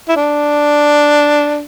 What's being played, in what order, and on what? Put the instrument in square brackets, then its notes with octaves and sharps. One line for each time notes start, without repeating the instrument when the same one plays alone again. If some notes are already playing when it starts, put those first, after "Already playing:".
[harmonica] E4
D4